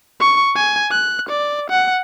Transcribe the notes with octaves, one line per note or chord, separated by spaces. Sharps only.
C#6
G#5
F#6
D5
F#5